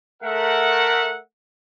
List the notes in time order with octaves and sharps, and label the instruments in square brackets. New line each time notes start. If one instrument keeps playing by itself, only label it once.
[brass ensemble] A3 A#4 E5 F#5